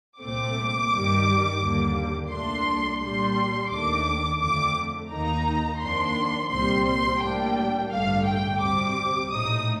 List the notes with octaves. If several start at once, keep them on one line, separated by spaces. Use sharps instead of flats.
C2 A#2 A3 C4 D6
G2 D#3 G3
D#2 D3 G3 A#3
C2 A#2 A3 D4 C6
A#2 G3 D4 C6
D#2 D#3 A3 D4 D6
F2 D3 A3 D6
D#2 D#3 A#3 D#4 A#5
F2 D#3 A#3 D4 C6
C2 A#2 G3 C4 C6
C6
A2 G3 A#3 D4 G5
A1 G2 D3 A3 F5
G5
D2 C3 G3 C4 D6
A#1 A2 A3 D#4 D#6